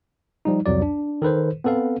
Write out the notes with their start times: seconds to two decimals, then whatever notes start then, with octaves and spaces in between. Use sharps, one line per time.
0.45 F3 G3 D#4
0.66 C2 F2 F#3 D5
0.82 D4
1.22 D#3 A4 B4 C5
1.64 B3 C4 A4 B4 F5